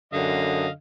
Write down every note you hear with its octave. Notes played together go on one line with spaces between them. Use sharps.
F#2 D3 D#5 F5